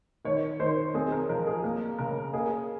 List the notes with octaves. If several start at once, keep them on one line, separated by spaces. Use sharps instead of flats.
D#3 C#5
D#3 C5
C4 G#4
A#4
F3 A#4
G#4
A#3 A#4
C#3 A#4
A#3 G#4